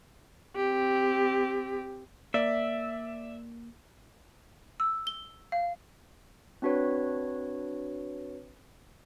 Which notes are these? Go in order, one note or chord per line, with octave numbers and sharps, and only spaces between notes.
C4 G4
A#3 D5 E5
E6
G7
F5
C4 D4 F#4 B4 C#5